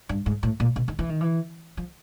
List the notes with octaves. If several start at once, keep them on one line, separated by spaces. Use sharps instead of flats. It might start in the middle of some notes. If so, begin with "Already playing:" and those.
G2
G#2
A2
A#2
B2
D#3
E3
D#3
E3
F3